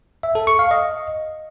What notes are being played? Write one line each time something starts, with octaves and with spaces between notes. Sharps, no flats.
E5
A4
C#6
F5
D#5